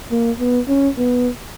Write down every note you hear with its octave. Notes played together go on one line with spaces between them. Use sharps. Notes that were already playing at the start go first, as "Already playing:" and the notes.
A#3
B3
C#4
B3